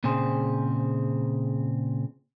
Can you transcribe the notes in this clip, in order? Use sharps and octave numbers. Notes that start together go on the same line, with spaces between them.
A#2 C#3 C4 G#4 C5